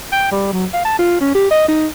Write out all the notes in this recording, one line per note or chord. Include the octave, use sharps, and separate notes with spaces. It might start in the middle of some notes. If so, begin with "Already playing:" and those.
G5
G3
F#3
F5
A5
F4
C#4
G4
D#5
D#4